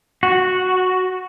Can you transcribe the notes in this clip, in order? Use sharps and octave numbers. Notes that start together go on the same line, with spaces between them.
F#4